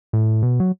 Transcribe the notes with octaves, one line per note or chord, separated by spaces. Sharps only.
A2
B2
F#3